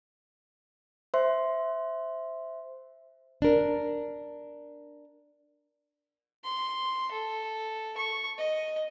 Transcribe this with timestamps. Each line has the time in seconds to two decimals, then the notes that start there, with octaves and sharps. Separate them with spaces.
1.14 C5 E5 C6
3.42 D4 A#4
6.44 C6
7.12 A4
7.97 C#6
8.38 D#5